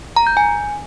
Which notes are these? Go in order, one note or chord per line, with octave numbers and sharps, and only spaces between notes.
A#5
G6
G#5